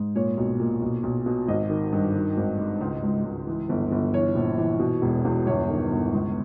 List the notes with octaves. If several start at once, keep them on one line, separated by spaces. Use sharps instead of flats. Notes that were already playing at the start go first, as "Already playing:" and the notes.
Already playing: G#2
A#2 C#5
B1
A#2
B1
B1
B2
G#1 D#5
D#3
G2
D#3
G#1
G#2
C#2
C#2
C#2
E3
G1
G1
E3 C#5
A#1
E3
B2
E1
E2
G1 C#5
D#3
G1
C#2